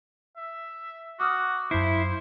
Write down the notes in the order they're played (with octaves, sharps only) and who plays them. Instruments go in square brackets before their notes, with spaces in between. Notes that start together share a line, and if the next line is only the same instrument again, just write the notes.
[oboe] E5
[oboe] F#4 [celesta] D6 D#6 F6
[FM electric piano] F#2 B5 C7 [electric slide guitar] E4 [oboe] C5